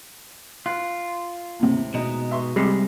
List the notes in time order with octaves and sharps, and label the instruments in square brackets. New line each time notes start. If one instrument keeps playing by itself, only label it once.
[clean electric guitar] F4 [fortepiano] F#6
[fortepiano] D#2 A2 C3
[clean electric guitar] B2 G#3 D#4
[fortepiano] E5 C6 C#6
[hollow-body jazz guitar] C3 G3 G#3